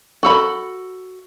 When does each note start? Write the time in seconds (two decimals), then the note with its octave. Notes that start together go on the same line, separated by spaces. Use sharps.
0.23 F#4 A4 B5